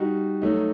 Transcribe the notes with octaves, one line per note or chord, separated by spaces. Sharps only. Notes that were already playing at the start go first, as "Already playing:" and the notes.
Already playing: G3 D#4 F#4
F#3 A3 D#4